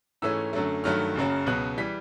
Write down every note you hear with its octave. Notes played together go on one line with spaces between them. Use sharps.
G#2 E3 A3 C#4 E6
F#2 D3 F#3 A3
G2 D#3 F#3 A3 F6
F#1 F#2 C#3 F#3
C#2 B2 F#3 B3 F#6
E3 G3 B6